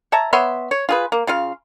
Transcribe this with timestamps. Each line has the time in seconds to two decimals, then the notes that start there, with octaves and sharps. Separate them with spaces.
0.12 C#5 E5 A5 A#5
0.33 B3 C#5 E5 C6
0.71 C#5
0.89 F4 G#4 B4
1.12 A#3
1.27 C#3 F4 F5